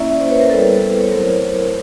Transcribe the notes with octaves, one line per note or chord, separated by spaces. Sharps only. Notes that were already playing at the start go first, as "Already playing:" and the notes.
Already playing: A#3 C#4 E4 D5 E5
C5 D5
B4 C#5
A#4 C5
G3 B3 E4 A4 B4
C#5
F#3 A3 C4 E4 A#4 C5